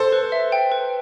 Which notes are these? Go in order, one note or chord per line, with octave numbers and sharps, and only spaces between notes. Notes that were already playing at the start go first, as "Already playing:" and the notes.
Already playing: A4 C5
B4
E5
G5
B4